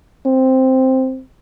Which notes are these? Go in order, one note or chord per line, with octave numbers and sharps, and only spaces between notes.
C4